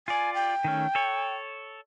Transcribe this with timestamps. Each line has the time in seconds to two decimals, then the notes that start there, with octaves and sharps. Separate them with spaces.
0.08 F4 D5 G#5
0.34 G5
0.64 D#3 A3 C#4
0.95 A4 C#5